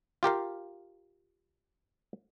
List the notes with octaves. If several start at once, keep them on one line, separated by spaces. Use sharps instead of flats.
F4 G4 A#4 F5